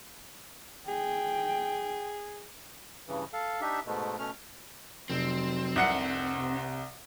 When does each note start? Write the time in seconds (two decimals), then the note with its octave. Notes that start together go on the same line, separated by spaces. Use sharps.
0.88 G#4 G5
3.08 G2 C#3 E3
3.33 A4 F5
3.61 D4 D#4 G4 E5
3.86 G#2 B2 G#3 A3
4.19 B2 A3 C#4 F6
5.10 F1 F#3 C4
5.76 C2 F#5 C#7
6.37 C3